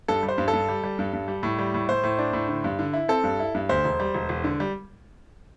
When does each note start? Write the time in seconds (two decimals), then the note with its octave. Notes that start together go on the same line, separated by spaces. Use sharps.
0.08 G2 A4
0.23 G3
0.28 C5
0.38 G2
0.48 A4
0.53 G2
0.69 G3
0.83 G3
0.99 G2
1.13 G2
1.28 G3
1.43 A2
1.59 G3
1.74 A2
1.89 A2 C5
2.03 A2
2.19 D4
2.33 A2
2.49 D3
2.64 G2
2.79 D3
2.93 E4
3.08 C4 A4
3.24 G2
3.39 E4
3.55 G2
3.69 D2 C5
3.84 E1
4.00 G3
4.15 E1
4.29 E1
4.44 D3
4.60 G3